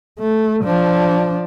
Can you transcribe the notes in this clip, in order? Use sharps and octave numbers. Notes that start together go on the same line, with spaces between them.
A3
F3 D4